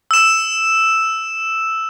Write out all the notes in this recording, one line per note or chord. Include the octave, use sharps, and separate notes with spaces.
E6 E7